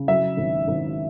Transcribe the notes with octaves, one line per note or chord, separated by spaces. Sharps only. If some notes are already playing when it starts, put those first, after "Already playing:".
Already playing: C#3
F#3 E5
G#1
G#1